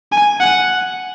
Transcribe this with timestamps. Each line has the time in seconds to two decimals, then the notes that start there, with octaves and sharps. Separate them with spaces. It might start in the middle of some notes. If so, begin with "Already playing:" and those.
0.12 G#5
0.41 F#5